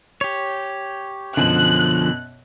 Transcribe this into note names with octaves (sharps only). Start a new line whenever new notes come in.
G4 C#5
F#2 B2 D3 F3 F#6